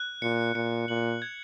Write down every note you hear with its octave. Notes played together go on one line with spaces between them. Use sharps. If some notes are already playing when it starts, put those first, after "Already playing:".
Already playing: F#6
A#2 C#7
A#2 C#7
A#2 F#7
G#6